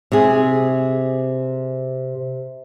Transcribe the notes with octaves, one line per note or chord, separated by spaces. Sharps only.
C3 G#4